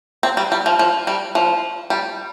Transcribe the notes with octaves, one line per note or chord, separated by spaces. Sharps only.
C4
G3
G3
F3
F3
G3
F3
G3